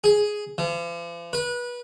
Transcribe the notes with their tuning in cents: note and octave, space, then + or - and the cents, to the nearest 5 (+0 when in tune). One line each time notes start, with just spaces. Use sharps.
G#4 +5
F3 -45
B4 -25